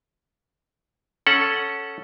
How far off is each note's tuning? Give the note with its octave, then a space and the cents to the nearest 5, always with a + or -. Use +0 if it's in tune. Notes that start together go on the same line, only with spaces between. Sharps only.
C#4 +0 A4 +0 F#5 +0